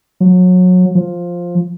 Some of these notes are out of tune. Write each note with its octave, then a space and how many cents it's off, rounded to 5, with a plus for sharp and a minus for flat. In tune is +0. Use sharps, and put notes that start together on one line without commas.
F#3 -25
F3 +5